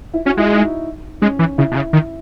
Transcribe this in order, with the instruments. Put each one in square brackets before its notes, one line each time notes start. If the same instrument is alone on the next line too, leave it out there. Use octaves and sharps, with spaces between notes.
[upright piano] E4
[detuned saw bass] C#4 [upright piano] F#4
[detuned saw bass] G#3 [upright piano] E4
[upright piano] D#4
[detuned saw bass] G#3 [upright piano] C#4
[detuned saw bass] E3
[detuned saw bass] C#3 [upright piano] E4
[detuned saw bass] B2
C#3
D#3